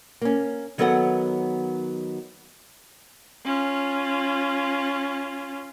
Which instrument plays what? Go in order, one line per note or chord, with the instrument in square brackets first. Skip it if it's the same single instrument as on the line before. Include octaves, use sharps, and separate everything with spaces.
[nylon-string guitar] A#3 C#4
D#3 F#3 B3 A4 C#5 F#5
[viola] C#4 F4